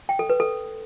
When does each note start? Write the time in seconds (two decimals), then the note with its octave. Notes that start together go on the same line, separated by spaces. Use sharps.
0.09 G5
0.19 A4
0.30 B4
0.40 A4